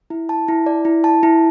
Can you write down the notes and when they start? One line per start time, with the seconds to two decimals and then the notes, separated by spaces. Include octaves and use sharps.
0.10 E4
0.29 A5
0.48 E4
0.66 D5
0.85 E4
1.04 A5
1.23 E4